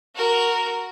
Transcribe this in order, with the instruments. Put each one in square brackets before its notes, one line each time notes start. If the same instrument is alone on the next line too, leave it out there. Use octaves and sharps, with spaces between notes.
[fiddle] F#4 A#4